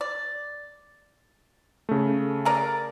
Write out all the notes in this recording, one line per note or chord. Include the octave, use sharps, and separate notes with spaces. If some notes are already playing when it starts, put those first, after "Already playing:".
D5
C#3 A3
G#4 A#4 D5